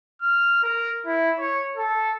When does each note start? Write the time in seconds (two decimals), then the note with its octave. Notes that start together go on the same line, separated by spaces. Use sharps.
0.22 F6
0.63 A#4
1.06 E4
1.39 C#5
1.77 A4